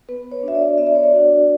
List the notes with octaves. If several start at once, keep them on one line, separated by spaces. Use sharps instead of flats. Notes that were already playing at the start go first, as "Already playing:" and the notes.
B3 B4
C#5
D4 F#4 E5
D5
B3 E5
D5
C#5
D5
D4 F#4